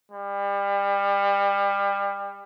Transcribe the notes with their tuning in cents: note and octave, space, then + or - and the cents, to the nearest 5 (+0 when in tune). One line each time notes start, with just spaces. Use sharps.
G3 +30